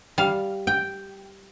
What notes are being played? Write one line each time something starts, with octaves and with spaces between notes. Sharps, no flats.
G3 F5
G5